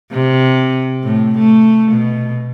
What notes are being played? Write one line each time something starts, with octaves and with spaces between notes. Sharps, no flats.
C3
A2
A3
B2